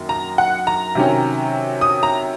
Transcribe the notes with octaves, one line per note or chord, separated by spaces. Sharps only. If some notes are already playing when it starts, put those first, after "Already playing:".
Already playing: F#2 D#3 F#3 A#3
A#5
F#5
A#5
C3 D#3 F#3 C#4
D#6
A#5